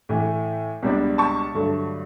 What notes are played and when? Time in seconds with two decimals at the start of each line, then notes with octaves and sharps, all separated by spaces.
0.09 A2 E3 A3
0.83 C#2 B2 G3 B3 D4
1.18 A5 C#6
1.54 G2 D3 F#3 A3